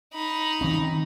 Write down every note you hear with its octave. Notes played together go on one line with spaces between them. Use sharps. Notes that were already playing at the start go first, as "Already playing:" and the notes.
D#4 B5
D#3 C4 C#4